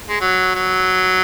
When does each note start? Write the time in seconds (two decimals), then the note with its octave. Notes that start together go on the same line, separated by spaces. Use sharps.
0.09 G#3
0.21 F#3
0.55 F#3